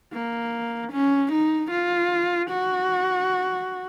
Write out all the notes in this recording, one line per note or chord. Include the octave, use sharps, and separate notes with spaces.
A#3
C#4
D#4
F4
F#4